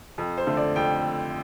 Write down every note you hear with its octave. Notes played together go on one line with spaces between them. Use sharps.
F2
C5
D3 A3
D5
F2 G5